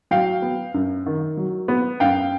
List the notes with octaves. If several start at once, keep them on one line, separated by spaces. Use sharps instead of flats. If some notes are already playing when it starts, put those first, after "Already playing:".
F#3 F5 G5
B3
F#2
D#3
F#3
B3
F#2 F5 G5